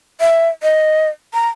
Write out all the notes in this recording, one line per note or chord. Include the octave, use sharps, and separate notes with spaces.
E5
D#5
A#5